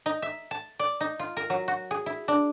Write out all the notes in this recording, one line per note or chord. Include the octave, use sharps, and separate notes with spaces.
D#4
E5
A5
D5
D#4
F4
A#4
F#3
F#4
G#4
E4
D4